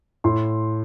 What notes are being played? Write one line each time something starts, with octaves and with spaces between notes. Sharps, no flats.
A2 C6